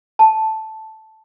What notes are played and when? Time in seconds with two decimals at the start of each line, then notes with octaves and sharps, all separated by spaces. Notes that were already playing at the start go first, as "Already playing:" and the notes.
0.19 A5